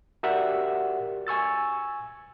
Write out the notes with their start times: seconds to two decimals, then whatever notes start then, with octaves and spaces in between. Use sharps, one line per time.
0.23 F#4 G4 A#4 D5 E5 F#5
1.27 G#5 C#6 E6 A6